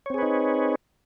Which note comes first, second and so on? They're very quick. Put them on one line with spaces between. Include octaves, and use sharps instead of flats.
C#5 C4 G#4 B4 D#4